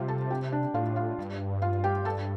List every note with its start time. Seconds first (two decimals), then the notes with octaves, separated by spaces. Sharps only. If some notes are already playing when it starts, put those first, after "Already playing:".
Already playing: C3 G3 F4 G4 F5
0.08 A4 A5
0.30 G4 G5
0.52 D4 D5
0.74 A2 F4 F5
0.96 F4 F5
1.18 G2
1.62 F4 F5
1.84 G4 G5
2.05 A4 A5